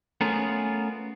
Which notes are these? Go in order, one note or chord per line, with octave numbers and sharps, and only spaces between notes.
A3 B3 C#4 F4 G#4 A#4